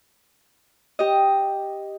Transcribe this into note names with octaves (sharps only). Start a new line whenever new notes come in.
G4 D#5